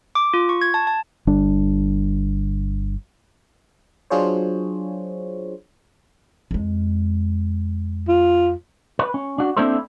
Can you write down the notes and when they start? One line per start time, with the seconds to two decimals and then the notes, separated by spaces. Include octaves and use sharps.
0.15 D6
0.34 F4
0.49 C#6
0.62 G#6
0.74 A5
0.87 A5
1.27 G1 D3 G3 D4
4.10 F#3 D4 F4 G#4 C5 C#5
6.51 F2 G#3
8.09 F4
8.99 B4
9.14 C#4
9.38 D4 F#4
9.57 A#3 C4 D4 E4 A4 C5